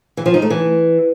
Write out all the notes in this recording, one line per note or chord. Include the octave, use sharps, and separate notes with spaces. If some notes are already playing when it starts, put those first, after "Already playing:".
E3
F3
D#4
A3
E3